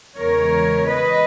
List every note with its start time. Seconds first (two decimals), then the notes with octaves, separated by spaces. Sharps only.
0.17 E2 C#3 G#3 A#4 C#5
0.87 B4 D#5